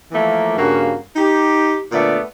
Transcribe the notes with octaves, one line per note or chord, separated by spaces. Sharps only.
E3 F3 A3 A#3
G2 C#3 A#3 F#4
D#4 G4
A#2 D3 A3 B3 D5